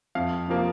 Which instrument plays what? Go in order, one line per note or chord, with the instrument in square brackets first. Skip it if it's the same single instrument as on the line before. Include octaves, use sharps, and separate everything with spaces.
[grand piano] F2 F5
C3 F3 A#3